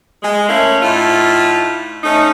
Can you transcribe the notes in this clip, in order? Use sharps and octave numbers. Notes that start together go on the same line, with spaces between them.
G#3
A3 A#3 C#4 E4
A2 A3 D#4 F4
A3 C#4 D#4